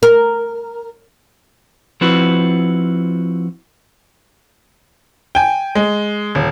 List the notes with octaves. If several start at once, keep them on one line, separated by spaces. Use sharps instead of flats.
A#4
F3 C4 E4 F#4 B4
G5 G#5
G#3
D#1